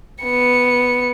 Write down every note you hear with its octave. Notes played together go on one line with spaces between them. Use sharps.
B3 C#7